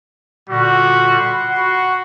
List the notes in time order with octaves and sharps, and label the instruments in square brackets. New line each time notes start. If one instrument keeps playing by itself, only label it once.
[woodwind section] A#2 D3 G3 [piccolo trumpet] F#4
[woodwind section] F#5 B5 C6
[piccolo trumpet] F#4